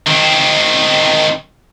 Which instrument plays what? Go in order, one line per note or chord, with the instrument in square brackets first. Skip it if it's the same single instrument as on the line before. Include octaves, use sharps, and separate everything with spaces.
[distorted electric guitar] D#3 C4